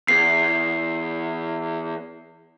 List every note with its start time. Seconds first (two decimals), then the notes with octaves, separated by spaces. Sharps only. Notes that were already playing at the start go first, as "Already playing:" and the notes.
0.08 E2 C7